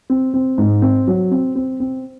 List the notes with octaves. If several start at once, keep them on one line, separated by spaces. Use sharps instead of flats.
C4
C4
G#2
C4
F#3
C4
C4
C4